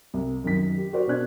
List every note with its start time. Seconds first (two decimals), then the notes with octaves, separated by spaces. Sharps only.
0.14 C2
0.44 F#2 D#3 B6
0.77 G4
0.93 F#4 A#4 C5 D5
1.07 B2 D4 F#6 G#6